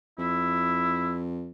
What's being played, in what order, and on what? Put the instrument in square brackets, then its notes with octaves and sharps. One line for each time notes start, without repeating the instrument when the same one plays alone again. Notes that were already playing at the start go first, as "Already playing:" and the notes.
[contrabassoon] F2 [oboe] E4